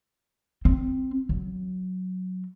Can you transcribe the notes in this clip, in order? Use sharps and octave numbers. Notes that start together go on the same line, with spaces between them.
C4
F#3